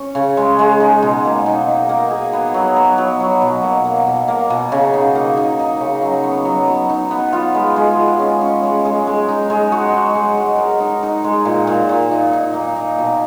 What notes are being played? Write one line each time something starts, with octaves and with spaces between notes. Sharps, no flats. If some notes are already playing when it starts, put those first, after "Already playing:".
Already playing: C#4
C#3
G#3
G#3
D#4
B2
A#3
D#4
D#4
A#3
G#4
B3
F#3
B3
F#3
F#3
B2
A#3
A#3
B2
A#3
B2
C#3
D#4
A#3
D#4
D#4
C#3
F#3
B3
F#3
B3
D#4
B3
F4
G#3
G#3
F4
C#4
C#4
G#3
G#3
G#3
D#4
G#3
F#4
D#4
G#3
G#3
A#4
D#4
D#4
G#3
A#2
A#2
A#2
D#4
D#4
A#3
D#4
B2